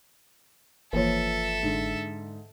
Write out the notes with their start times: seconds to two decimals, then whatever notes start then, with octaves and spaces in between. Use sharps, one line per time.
0.93 G1 E3 F3 A#3 A4 B4 C#5 E5
1.63 G#2 D3